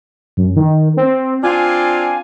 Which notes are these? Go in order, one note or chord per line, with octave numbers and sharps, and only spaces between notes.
F#2
D#3
C4
C4 D4 F4 G#5